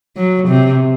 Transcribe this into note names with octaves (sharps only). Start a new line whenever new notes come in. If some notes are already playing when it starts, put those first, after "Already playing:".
F#3
C3